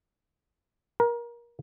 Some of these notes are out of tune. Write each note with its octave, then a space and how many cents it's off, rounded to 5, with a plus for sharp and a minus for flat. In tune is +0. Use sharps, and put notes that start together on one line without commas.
A#4 +25